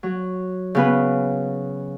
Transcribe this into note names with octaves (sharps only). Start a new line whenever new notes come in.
F#3
C#3 B3 B4